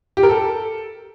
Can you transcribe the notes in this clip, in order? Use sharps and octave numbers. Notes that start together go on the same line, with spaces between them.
G4
A#4
A4